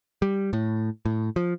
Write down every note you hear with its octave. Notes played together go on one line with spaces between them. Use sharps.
G3
A2
A2
F3